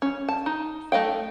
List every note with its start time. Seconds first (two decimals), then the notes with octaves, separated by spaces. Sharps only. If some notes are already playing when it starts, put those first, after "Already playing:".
0.02 C#4
0.28 A5
0.46 D#4
0.92 A3 D#5 F5 G5